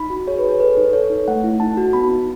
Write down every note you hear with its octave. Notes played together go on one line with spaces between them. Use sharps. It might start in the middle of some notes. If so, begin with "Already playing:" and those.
Already playing: D#4 B5
F#4
G#4 C#5
B4
G#4
C#5
A4 B4
D#4
A4 C#5
D#4
A3 F#5
E4
D#4 A5
F#4
B3 B5
D#4